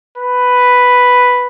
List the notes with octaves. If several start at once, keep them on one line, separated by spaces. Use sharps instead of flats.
B4